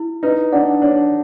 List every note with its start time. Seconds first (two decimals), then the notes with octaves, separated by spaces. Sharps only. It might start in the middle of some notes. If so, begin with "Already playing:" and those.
Already playing: E4
0.23 D#4 B4
0.52 D4 F#5
0.82 D4 C#5